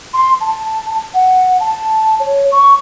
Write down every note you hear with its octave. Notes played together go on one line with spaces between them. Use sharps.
C6
A5
F#5
A5
C#5
C#6